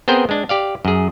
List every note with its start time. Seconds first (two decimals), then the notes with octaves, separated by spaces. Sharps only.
0.08 B3 C4 G#4 A#4 C5 G5
0.29 G#3 D4
0.49 G4 D5 F5
0.85 F#2 G#4